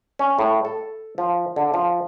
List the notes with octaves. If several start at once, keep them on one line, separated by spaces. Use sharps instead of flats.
C#4
A2
A4
F3
D3
F3